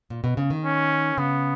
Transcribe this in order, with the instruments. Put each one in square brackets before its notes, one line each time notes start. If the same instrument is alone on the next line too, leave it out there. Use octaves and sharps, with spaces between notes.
[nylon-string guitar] A#2
B2
C#3
D#3
[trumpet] C#4
[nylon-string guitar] C#3 [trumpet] B3